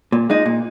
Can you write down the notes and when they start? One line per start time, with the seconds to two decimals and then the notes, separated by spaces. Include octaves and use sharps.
0.12 A#2
0.30 G#3 D#4
0.46 A#2